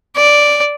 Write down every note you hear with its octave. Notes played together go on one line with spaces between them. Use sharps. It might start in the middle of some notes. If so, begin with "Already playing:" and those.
D5